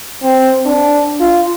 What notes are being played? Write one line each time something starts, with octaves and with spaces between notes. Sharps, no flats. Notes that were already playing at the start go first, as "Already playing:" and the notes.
C4
D4
F4